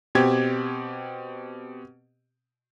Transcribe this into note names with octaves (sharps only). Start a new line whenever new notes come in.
B2 C4 G4 G#6